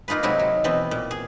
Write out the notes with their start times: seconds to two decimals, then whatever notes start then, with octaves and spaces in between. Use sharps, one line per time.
0.08 A#3 D#4 F4 G#4 B4
0.23 C3 F#3 G#3 D#4 E4
0.39 F#3
0.64 B2 E3 B3 C4
0.91 A#2
1.11 G#4